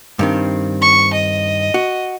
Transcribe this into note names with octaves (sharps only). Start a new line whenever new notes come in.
G2 D#3 C4
C#6
D#5
F#4